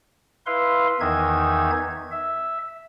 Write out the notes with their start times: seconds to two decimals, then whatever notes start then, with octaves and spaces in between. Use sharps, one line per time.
0.46 E4 B4 F5 C6
1.00 E2 D#3 E3 D#4 E5 G#6
2.11 E5